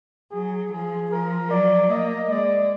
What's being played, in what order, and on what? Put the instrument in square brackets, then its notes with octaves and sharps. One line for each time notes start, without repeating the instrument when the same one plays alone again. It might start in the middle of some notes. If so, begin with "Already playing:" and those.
[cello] F#3 [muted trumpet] G#4
[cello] F3 [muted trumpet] G#4
[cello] F3 [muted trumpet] A#4
[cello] F#3 [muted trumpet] D5
[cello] A#3 [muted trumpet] D#5
[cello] G#3 [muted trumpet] D5